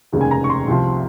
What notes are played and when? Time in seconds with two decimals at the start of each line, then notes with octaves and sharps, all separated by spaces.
0.12 F1 D#2 C#3 G#3
0.21 G#5
0.31 A#5
0.44 C#6
0.50 C6
0.67 C2 C3 F3